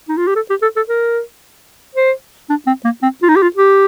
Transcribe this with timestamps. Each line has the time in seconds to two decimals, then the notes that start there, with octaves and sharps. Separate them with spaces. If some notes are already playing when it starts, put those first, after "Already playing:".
0.09 D#4
0.17 F4
0.27 G4
0.36 A4
0.50 G4
0.62 A4
0.76 A4
0.89 A#4
1.95 C5
2.49 D4
2.67 C4
2.84 A#3
3.03 C4
3.22 F4
3.29 D#4
3.36 G4
3.42 F4
3.56 G4